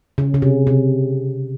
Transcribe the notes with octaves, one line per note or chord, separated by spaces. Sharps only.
C#3
C#3
C3
C3